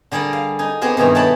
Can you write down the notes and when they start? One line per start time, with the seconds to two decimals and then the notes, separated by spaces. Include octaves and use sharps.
0.12 D3 G3 G#4 A#4 D5
0.33 F5
0.59 D#4 G#5
0.81 B3 C4 G4 G#4 A#4 C5
0.97 G2 B2 D#3 E3
1.15 A4 C#5 F#5 G5 A5 B5